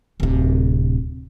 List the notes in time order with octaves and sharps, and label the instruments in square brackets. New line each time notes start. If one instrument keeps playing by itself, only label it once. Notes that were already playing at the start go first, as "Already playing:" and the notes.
[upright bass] D1 C3